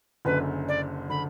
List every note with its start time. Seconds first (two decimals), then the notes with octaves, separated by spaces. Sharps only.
0.25 F#1 F#2 D3 B4
0.68 D5
1.09 D3 B5